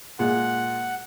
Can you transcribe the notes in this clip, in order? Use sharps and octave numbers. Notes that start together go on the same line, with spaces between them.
A#2 G#3 F#5